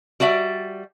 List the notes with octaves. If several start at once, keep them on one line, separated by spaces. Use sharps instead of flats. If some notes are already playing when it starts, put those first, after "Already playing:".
G3 F#4 D5 E5